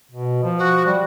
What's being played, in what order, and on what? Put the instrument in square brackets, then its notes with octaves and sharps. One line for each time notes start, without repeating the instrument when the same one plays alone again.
[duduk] B2
F3
[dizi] F#4
[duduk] G3 [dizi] F#4